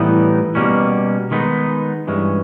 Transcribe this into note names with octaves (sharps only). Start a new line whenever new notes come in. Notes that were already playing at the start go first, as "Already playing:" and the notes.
Already playing: A2 E3 G3 B3 D#4
B2 G3 A#3 C#4
D#3 G#3 B3 D#4
G2 E3 G#3 C#4